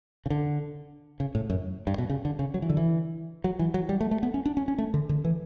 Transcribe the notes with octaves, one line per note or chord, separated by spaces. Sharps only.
C#3
D3
C#3
A2
F#2
G2
B2
C#3
D3
C#3
F#3
E3
D3
E3
F#3
E3
F#3
G3
A3
A3
B3
C#4
D4
C#4
C#4
A3
D3
D3
E3